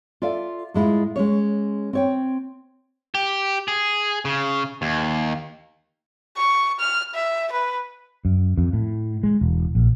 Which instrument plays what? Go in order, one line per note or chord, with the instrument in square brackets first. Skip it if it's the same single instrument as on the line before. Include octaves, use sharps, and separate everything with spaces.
[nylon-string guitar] F4 A4 D5 E5 F5
A2 G#3 E4 F4
G#3 C#4 C#5
C4 C#5 G5
[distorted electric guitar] G4
G#4
C#3
D#2
[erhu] C#6
F6
E5
B4
[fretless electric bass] F#2
F2
A2
G#3
E1
A#1